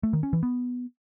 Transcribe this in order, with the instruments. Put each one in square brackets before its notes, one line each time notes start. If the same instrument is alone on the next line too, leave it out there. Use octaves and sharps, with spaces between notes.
[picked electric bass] A3
D#3
C#4
E3
B3